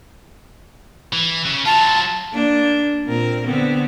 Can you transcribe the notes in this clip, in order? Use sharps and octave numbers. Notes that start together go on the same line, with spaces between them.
E3
C#3
F#3 F4 A5
A#3 D4
A#2 C4 A#4
D3 B3 C4